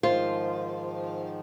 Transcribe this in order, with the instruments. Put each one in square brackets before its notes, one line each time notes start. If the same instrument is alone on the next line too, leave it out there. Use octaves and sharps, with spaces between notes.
[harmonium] G#2 D#3 F3 [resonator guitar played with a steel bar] F4 [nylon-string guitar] C5